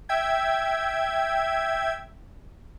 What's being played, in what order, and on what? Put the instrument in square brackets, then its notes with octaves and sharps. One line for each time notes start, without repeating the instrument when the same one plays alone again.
[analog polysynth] E5 G5 G#6